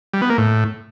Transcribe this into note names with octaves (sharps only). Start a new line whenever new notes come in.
G3
B3
A#3
A2